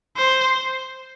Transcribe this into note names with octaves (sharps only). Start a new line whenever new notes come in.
C5